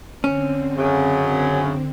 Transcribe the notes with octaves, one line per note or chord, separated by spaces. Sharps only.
D3 C4 C#4
F#2 C#3